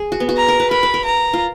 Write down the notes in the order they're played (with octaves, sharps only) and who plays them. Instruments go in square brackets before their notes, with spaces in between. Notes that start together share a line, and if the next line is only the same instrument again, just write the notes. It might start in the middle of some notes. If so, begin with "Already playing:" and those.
Already playing: [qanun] G#4
F#4
B3
F#4
[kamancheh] A#5
[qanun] A#4
B4
[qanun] A#4 [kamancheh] B5
[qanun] B4
A#4
[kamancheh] A#5
[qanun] F4